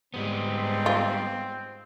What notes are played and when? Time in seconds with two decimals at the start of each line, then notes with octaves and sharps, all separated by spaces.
0.14 G#2 G3 B3 C4
0.86 F4